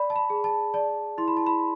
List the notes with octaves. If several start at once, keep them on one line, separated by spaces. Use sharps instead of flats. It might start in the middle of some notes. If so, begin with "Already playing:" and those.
Already playing: D5 B5
A5
B5
G#4
A5
D5 A5
E4 C6
B5
A5
B5